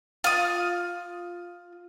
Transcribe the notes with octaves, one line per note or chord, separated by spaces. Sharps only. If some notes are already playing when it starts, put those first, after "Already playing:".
F4 D#6